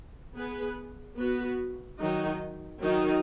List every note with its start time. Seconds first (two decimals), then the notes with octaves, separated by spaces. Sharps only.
0.34 B3 G#4 B4
1.17 B3 F#4 B4
1.99 D#3 F#3 D#4
2.81 D#3 F#3 D#4